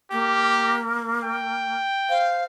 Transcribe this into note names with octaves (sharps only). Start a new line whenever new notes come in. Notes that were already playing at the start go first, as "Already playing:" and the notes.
A#3 G4
G5
C5 F5